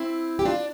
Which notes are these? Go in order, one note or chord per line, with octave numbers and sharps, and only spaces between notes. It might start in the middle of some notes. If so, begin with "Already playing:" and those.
Already playing: C4 E4
G4
D4 F4